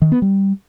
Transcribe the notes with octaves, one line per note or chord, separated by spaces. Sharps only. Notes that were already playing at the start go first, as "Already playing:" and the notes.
D#3
B3
G3